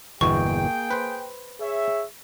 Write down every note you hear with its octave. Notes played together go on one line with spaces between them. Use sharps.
G1 E2 B2 A#3 G#4 G5 C#6
B4 C5
G#4 C#5 E5